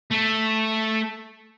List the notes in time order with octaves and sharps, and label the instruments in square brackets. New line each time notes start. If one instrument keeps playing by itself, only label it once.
[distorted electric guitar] A3 A4